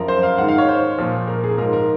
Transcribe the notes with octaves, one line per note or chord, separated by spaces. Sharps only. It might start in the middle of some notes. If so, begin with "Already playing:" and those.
Already playing: F#2 F3 A#4
C5
F5
G#2 D#3 F#5
F5
C#5
C5
A#2 F3
A#4
G#4
G#2 F3 A#4
A#4